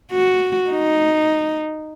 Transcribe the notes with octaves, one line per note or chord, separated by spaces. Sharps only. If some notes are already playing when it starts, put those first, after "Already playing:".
F#4
D#4